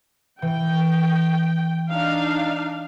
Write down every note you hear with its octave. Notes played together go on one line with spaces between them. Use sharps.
E3 G5
D4 D#4 F5